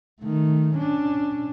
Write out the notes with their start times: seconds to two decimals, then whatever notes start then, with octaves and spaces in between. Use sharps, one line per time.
0.20 D#3 A3
0.74 C#4 D4